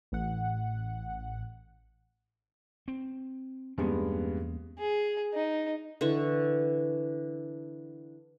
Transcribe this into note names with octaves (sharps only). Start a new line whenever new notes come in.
A1 F#5
C4
E2 G2 G#3 A#3 B3 C#4
G#4
D#4
D3 E3 C#6